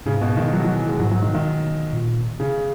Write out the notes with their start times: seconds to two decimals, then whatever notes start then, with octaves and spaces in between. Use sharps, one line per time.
0.05 G#2 C#3
0.21 B2
0.37 D#3
0.53 F#3
0.64 F#3
0.76 E3
0.88 G#3
0.99 G#2 F#3
1.11 F#3
1.22 D#3
1.35 D#3
1.93 A#2
2.40 C#3